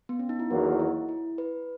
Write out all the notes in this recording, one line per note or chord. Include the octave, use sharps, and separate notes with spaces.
B3
C#4
D#4
E4
E2 D#3 F#3 A#3 F#4
E4
E4
B4